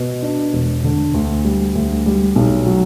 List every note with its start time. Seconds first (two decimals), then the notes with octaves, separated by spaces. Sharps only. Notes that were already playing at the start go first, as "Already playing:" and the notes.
Already playing: B2
0.22 D4
0.53 E1
0.84 D3
1.14 D2
1.45 G3
1.75 D2
2.06 G3
2.36 B1
2.67 F#3